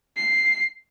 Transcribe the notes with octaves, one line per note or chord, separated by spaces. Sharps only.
C7